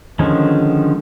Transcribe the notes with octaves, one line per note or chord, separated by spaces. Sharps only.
D3 D#3 F3 G#3 C#4